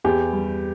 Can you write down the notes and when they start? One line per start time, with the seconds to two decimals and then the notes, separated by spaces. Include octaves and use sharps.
0.04 E2 G4
0.33 G3